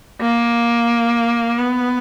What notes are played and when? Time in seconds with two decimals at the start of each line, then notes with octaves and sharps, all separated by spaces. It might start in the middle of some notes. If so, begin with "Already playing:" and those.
0.21 A#3
1.59 B3